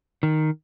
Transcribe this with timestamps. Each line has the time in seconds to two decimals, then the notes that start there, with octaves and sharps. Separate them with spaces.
0.23 D#3